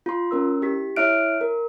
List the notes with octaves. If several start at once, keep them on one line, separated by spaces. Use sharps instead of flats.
F4 C6
C#4 A#4 E6
E4 G4 B6
E4 C#5 E5 F6 F#6 D7
A#4